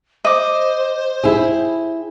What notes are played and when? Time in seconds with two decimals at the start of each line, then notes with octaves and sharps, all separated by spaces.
0.25 C5 D#5 D6
1.24 E4 G4 G#4